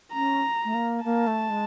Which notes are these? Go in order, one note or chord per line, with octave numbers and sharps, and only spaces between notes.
C#4 A#5
A3
A#3
A#3 A5
A3
G#3